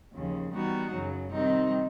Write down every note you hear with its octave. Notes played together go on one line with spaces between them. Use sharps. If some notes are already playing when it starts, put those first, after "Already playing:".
D#2 C#3 F3
E3 G3 B3 D#4 F#4
F#2 C#3 F#3
C3 D#3 G3 C4 D#4